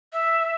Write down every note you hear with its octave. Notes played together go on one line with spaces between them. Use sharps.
E5